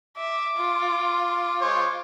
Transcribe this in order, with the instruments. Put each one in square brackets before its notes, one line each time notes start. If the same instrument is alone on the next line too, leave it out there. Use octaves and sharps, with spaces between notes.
[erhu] E5 [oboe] D6
[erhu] F4
[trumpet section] G#3 C5 C#5